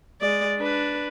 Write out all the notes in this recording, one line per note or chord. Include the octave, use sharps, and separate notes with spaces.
G#3 D5
D4 B4